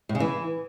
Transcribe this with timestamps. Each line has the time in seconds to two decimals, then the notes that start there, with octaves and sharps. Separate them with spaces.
0.09 A2
0.15 C#3
0.20 E3